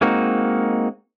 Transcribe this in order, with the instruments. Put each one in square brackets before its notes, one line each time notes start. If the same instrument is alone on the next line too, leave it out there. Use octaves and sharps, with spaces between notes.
[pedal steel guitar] G#3 A#3 C4 D#4 F#4